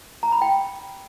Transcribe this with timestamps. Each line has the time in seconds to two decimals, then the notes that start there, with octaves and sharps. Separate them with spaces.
0.23 A#5
0.32 B5
0.42 G5